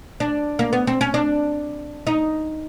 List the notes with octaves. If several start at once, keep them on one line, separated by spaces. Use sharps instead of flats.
D4
A#3
B3
C4
C#4
D4
D#4